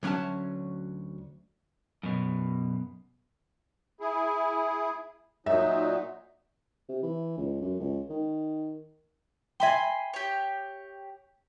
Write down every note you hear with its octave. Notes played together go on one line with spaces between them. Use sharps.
D2 F#3 C#4 E5 A5
F#2 B2
E4 G#4
A#2 F#3 D#4 E5
C3
E3
C#2
F#2
C#2
D#3
E5 G5 G#5 B5 C6
G4 C#5